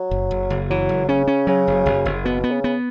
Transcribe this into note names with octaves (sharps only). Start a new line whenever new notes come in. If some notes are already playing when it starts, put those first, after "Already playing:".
Already playing: F#3
F#1
F#1
F#1
E3 F#3
F#1
C#3 C#4
C#4
C#3 F#3
F#1
F#1
F#1
B2 B3
B3
C#3
B3